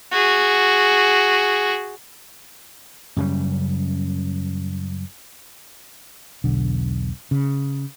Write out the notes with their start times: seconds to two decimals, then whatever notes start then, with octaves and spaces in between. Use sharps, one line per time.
0.12 F#4 G#4
3.17 F#2 C#3 G3
6.44 E1 B1 D3
7.31 C#3